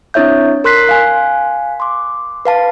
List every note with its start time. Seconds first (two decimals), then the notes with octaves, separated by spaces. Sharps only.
0.14 C4 D4 E4 C#5 E5 G6
0.64 A#4 C6 F#6 B6 C7
0.89 F5 G#5 F#6
1.80 C6 D6
2.45 B4 F5 A5